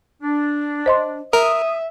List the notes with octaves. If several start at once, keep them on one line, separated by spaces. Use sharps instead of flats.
D4
C5 D#5 C6
A#4 E5 D#6